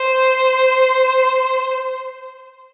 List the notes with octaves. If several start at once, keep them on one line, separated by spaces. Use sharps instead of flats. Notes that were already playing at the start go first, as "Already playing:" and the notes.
Already playing: C5